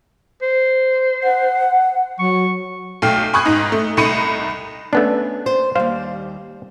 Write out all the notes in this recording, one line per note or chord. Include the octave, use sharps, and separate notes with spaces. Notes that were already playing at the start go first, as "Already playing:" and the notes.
C5
F#5
F#3 C#6
B1 A3 G5 F6 C7
G#5 B5 C#6 D#6 F#6 G#6
G#2 D#4
A3
C2 A3 D#4 B5 C#7 D#7
A3 B3 C#4 D4
C5
D#2 G3 C5 F5